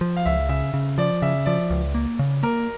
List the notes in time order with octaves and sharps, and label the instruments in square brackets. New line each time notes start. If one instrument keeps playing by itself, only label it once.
[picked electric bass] F3
[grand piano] F5
[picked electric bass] C#2 [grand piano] E5
[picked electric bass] C#3 [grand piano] E5
[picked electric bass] C#3
[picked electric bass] F3 [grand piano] D5
[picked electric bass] C#3 [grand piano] E5
[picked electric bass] F3 [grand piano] D5
[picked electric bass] C#2
A#3
C#3
[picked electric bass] A#3 [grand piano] A#4